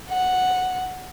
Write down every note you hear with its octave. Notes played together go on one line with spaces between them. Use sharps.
F#5